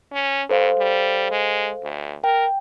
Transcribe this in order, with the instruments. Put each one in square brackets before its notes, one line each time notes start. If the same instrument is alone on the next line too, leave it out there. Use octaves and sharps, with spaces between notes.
[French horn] C#4
[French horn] G2 [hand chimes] A4 C5 F5
[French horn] G3
G#3
D2
[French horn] A#4 [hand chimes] G5